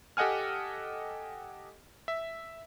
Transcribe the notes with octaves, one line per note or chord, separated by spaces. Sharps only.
G4 A4 D#5 F#5 G#5 F6
E5